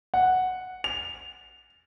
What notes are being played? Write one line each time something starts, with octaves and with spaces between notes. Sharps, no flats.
F#5
F7